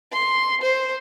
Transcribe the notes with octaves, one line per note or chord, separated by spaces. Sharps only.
C6
C5